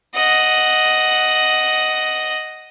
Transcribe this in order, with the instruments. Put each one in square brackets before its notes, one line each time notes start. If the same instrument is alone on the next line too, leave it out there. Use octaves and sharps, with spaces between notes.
[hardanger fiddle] D#5 F#5